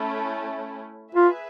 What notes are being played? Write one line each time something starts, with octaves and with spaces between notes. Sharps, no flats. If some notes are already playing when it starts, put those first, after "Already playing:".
Already playing: A3 C#4 E4
F4 G#4 B4 E5